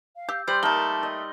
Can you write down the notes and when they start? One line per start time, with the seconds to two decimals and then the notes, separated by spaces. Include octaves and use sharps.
0.16 F5
0.29 G4 E6 G6
0.48 G3 C5 C6 G6 F#7
0.63 A3 A#3 D#4 A#4 A5 G7
1.03 D#5